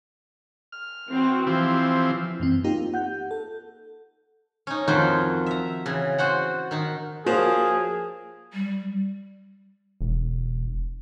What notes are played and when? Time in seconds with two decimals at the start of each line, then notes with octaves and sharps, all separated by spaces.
0.72 F6
1.09 E3 C4 F#4
1.47 E3 F3 C4 G4
2.40 F#2 E3 C4
2.64 A#3 D#4 F4 G4
2.94 F#5 G6
3.31 A4
4.67 C#4 D#4
4.88 F2 D#3 F4 F#4 C5
5.46 E5 A#5
5.86 C#3 E3
6.18 F#4 C5 F#5
6.71 D#3 D#4
7.26 F3 A#3 F#4 G#4 C5 C#5
8.53 G3
10.01 E1